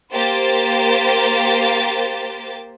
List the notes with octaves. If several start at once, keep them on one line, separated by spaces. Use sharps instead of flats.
A#3 G4 C5 A6